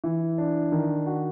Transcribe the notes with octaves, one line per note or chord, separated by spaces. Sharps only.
E3
D4
D#3
F#4